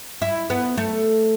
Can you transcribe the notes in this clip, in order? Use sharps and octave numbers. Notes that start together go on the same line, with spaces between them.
E4
B3
A3